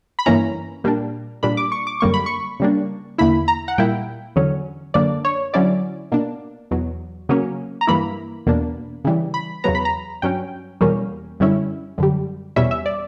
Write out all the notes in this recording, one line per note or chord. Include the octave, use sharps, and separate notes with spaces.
B5
G2 E3 A#3 C#4 E4 A#5
A#2 G3 A#3 D4
A#2 G3 A#3 D4 B5
D6
C#6
D6
F#2 D3 G3 A#3 C#6
B5
C#6
C#3 G3 A#3 D4
E2 D3 A#3 E4 B5
A#5
F#5
A#2 G3 A#3 E4 G5
E2 D3 F#3 C#4
F#2 D3 A#3 D4 D5
C#5
D3 F#3 C#4 E4 D5
B2 A#3 D4
E2 B2 F#3
C#3 F#3 A#3 C#4
A#5
G2 E3 A#3 E4 B5
E2 B2 A#3 D4
C#3 E3 G3
B5
E2 C#3 F#3 B3 A#5
B5
A#5
G2 F#3 C#4 G5
E2 B2 G3 A#3 C#4
F#2 D3 G3 C#4 E4
F#2 D3 G3
E2 B2 G3 C#4 E5
E5
D5